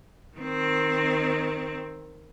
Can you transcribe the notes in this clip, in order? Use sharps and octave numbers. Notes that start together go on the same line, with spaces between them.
D#3 C4